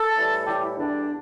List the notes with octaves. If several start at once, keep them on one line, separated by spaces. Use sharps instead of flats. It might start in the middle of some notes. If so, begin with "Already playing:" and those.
Already playing: A4
A2 E3 G3
A2 E3 G3 G4
E4
E2 D3 G3 D4